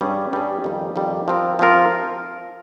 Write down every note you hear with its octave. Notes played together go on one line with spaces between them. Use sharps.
G2 G3 C#4 G#4
G2 G3 C#4 G#4
F2 D#3 G3
F2 D#3 G3
F3 C4 F4 A#4
F3 C4 F4 A#4